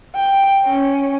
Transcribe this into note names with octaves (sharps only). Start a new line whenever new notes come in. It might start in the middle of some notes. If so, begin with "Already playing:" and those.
G5
C#4